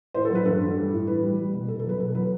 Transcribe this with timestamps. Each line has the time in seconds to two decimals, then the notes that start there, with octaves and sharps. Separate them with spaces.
0.14 A2 C5
0.25 A4
0.30 F#3
0.35 B4
0.45 G2 A4
0.61 G2
0.76 G3
0.91 A2
1.07 E3 B4
1.22 G3
1.38 G3
1.53 B2
1.68 B2 A4
1.79 A4
1.84 F#3
1.89 B4
1.99 B2 A4
2.15 F#3 B4